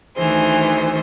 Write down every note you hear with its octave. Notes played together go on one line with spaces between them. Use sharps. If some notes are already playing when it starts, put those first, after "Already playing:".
D2 D#3 E3 G#4 C5